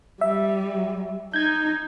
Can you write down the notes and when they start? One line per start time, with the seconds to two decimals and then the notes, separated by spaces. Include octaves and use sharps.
0.21 G3 E5
1.34 D#4 G6 G#6